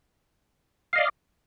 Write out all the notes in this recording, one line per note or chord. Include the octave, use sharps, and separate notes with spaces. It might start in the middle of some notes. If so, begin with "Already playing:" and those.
D5 D#5 F5